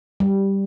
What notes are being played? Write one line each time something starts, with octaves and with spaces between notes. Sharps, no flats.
G3